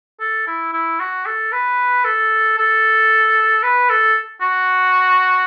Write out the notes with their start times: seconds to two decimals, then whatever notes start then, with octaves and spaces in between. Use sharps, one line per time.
0.20 A4
0.47 E4
0.73 E4
1.00 F#4
1.26 A4
1.52 B4
2.04 A4
2.58 A4
3.63 B4
3.89 A4
4.41 F#4